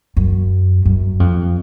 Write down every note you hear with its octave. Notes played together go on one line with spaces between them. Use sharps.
F#2
F#2
F2